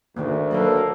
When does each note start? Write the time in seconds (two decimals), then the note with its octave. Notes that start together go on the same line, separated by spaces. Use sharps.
0.16 D2 D#3 A3 A#3
0.52 F#3 A#3 A4 B4